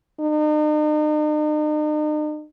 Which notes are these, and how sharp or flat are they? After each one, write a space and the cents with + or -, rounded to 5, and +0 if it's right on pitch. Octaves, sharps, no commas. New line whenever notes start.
D#4 -45